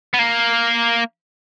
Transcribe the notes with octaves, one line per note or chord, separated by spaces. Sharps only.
B3
A#3